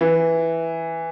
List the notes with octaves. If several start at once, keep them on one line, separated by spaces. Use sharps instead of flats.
E3